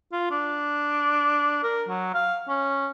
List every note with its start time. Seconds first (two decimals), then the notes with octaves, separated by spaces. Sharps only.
0.12 F4
0.31 D4
1.63 A#4
1.89 F#3
2.14 F5
2.48 C#4